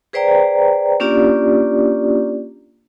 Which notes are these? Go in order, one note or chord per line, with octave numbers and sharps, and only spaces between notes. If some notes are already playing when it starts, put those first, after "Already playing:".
G#4 B4 C5 D5 G5 A#5
A#3 C#4 D4 F4 G4 D5